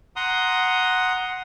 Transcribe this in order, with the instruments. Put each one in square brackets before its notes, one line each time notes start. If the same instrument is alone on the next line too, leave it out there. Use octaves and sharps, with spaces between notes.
[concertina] F#5 A#5 C6 D#6